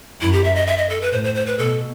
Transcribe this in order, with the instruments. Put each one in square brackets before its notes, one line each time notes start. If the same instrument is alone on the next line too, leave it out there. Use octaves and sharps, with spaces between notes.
[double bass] F#2 [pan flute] E4
[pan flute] G4
E5
D#5
E5
D#5
A4
B4
[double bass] A2 [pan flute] C5
[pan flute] C5
C5
B4
[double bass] B2 [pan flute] A4